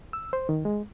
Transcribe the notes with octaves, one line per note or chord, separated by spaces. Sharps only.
E6
C5
D#3
G#3